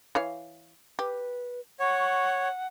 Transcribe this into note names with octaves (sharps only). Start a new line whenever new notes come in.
E3 C#5 F5
G4 B4
C#5 F#5 C#6